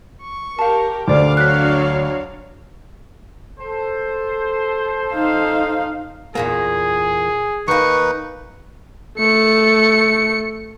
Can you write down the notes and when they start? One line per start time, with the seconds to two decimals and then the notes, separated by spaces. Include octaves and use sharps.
0.23 C#6
0.59 G4 A#4 F5 A5
1.08 D2 D4 C5 D5 F5 D6
1.37 F#3 C#5 F#6 B6
3.59 A4 C5
5.15 D#4 F5
6.35 E2 A#2 A#3 G#4
7.68 D#2 A#3 D#4 B4 C#6
9.18 A3 C#7